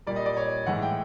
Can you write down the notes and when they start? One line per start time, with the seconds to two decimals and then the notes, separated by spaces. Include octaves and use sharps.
0.07 A#2 G3 D5
0.16 D#5
0.26 D5
0.37 C#5
0.66 A2 E3 G#3 F#5
0.82 G5